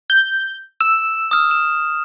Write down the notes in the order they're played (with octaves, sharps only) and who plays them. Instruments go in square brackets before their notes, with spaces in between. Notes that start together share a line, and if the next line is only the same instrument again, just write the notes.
[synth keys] G6
[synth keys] E6 [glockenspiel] E7
[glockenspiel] D#6 F6
E7